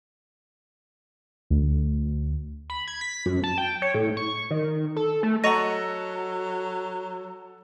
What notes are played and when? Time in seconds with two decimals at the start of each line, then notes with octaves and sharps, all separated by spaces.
1.50 D2
2.70 B5
2.88 G#6
3.01 B6
3.26 F#2
3.44 A5
3.58 G5
3.82 C#5
3.94 A2
4.17 C#6
4.51 D#3
4.96 A4
5.23 A3
5.44 F#3 A4 D#5 F#5 A#5 C#6 A#6 D#7